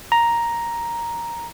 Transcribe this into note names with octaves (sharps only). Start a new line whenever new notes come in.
A#5